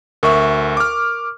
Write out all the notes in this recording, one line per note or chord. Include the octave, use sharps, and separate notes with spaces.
D2 A#4 E5 C#6
D6 F6